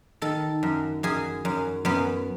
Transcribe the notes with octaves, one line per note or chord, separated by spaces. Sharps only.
D#3 A4
F#2
F#2 G#4
F#2
F#2 B3